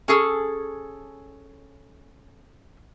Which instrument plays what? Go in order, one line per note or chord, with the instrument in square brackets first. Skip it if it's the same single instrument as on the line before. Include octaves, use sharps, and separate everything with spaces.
[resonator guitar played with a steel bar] C#4 G#4 A4